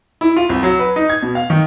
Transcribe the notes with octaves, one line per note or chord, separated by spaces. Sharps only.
E4
F4
C2
F#3
B4
D#4
G#6
B2
F5
D#3